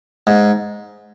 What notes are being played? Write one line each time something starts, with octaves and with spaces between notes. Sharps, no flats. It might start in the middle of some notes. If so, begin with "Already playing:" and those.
G#2